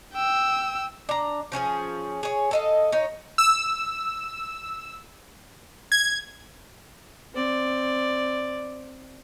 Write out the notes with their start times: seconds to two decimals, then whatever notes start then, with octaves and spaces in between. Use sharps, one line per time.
0.14 G5 E6
1.09 D4 A#5
1.52 F3 C#4 D#4 G#4
2.23 G#4 C#5
2.51 A4 D#5 F5
2.92 D#4 C#5
3.38 E6
5.92 G#6
7.34 C4 D5